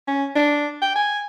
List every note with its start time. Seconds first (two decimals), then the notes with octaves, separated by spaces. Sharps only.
0.07 C#4
0.35 D4
0.82 G5
0.95 G#5